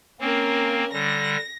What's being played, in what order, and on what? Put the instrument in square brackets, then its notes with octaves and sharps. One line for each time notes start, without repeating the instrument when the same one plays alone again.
[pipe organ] A#3 C4 [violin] C#4 A#4
[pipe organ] D3 G3 [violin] A#6